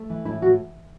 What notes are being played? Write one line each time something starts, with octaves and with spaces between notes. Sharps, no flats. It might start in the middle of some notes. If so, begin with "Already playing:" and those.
Already playing: A3
E3
A2 E4
A2 F#4